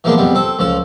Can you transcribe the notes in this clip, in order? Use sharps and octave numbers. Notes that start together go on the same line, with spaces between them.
E3 F3 G#3 A#3 B3 D4
F2 G3 B3
C4 A4
C#2 F3 A4